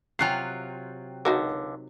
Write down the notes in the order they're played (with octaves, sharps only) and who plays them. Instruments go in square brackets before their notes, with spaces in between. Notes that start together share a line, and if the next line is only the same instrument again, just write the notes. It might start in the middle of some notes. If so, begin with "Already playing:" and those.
[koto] C3 F#3 F4 [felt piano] G5 F#6 C7
[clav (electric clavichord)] C#2 D3 [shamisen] D#4 F#4 A#4